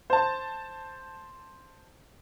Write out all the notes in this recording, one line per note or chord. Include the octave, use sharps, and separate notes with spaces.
C5 A5